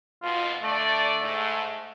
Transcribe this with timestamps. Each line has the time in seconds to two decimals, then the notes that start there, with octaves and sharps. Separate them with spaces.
0.23 F2 G#2 B2 F4
0.63 D3 A3 D5
1.21 G#2